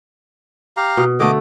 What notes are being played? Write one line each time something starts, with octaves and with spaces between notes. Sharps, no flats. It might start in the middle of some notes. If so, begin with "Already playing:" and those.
G4 F5 A#5
B2
D3 A3 D#5 D6